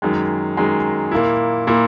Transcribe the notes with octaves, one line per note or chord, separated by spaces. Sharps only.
F#2 D#3 G#3
F#2 D#3 G#3
A#2 A#3 E4
A#2 A#3 E4